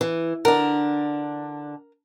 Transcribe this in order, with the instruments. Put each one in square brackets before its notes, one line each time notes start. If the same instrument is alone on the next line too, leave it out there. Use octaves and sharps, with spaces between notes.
[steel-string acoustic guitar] E3
[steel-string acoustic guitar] D3 D4 [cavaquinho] A#4